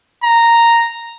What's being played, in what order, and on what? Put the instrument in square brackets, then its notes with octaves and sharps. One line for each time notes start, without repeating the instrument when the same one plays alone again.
[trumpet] A#5